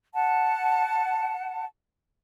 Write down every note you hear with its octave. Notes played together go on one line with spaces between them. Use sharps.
F#5 A5